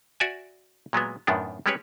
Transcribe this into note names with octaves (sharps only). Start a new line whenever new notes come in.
F#4 D5 E5 G#5
A#2 F#3 G#3 B3
F#2 A2 D#3 B3 D4
G3 G#3 C#4 G4 B4 C#5